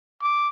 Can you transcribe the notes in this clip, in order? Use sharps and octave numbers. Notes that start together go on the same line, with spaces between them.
D6